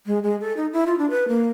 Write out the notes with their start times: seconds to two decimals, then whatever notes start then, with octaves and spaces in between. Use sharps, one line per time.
0.06 G#3
0.23 G#3
0.41 A4
0.57 D#4
0.73 E4
0.87 F4
0.98 D4
1.10 B4
1.28 A#3